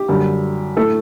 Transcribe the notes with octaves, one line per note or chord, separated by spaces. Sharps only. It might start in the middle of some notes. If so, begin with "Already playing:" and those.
Already playing: G4
F#2 D3 G3
A2 A3 A4